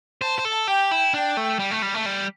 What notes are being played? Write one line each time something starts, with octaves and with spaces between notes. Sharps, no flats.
C5 A5
C5
A4
G4 G5
E4
D4 G5
A3
G3
A3
G3
A3
G3